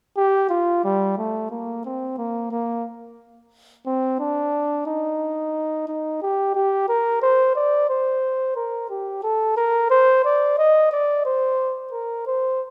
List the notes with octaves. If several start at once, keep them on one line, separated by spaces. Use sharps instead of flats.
G4
F4
G3
A3
A#3
C4
A#3
A#3
C4
D4
D#4
D#4
G4
G4
A#4
C5
D5
C5
A#4
G4
A4
A#4
C5
D5
D#5
D5
C5
A#4
C5